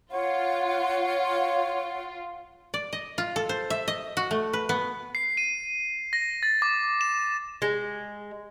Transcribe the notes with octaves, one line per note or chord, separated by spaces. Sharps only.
F4 C#5 F#5
D5
D#5
F4
A4
C5
E5
D#5
F#4
A3
B4
B3
C7
D#7
A#6
A6
D6
E7
G#3